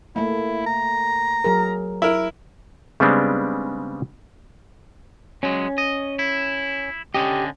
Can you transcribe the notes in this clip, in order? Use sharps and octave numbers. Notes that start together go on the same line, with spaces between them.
A3 A#3 E4
A#5
F#3 G#4 A#4
E4 A#4
C#3 G3 G#3 B3 C4 D4
F#3 G#3 C#4
D#5
E4
D3 C#4 G4 D#5